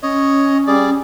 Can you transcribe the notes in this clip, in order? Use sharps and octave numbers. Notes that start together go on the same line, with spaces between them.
C#4 C#5 D#5
G3 G#4 D5